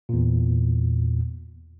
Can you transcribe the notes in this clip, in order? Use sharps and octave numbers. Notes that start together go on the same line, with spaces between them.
E2 A#2